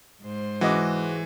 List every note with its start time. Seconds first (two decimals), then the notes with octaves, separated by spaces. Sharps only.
0.22 G#2 C5
0.61 E3 G#3 F#4 D#5 D6